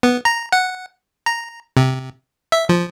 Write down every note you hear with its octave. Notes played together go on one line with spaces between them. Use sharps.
B3
A#5
F#5
A#5
C3
E5
F3